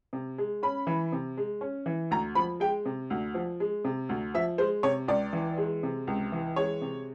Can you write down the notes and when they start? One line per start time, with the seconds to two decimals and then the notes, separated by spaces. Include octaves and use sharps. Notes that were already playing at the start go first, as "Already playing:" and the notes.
0.13 C3
0.38 G#3
0.63 C#4 B5
0.87 E3
1.12 C3
1.37 G#3
1.61 C#4
1.86 E3
2.11 D2 A#5
2.35 F3 B5
2.60 G#3 G5
2.85 C3
3.10 D2
3.34 F3
3.60 G#3
3.85 C3
4.09 D2
4.34 F3 E5
4.58 G#3 C5
4.83 C3 C#5
5.08 C#2 D5
5.33 E3
5.58 G#3
5.83 C3
6.07 C#2
6.32 E3
6.56 G#3 C#5
6.81 C3